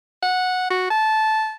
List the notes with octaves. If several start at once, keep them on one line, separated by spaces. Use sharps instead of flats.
F#5
F#4
A5